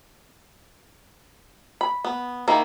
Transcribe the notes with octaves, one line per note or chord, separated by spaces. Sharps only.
B5
B3
D#3 A#3 E4